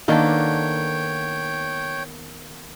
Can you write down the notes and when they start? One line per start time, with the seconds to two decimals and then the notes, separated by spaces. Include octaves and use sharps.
0.08 D#3 A#3 B3 D4 D#4 A4 C#5 G5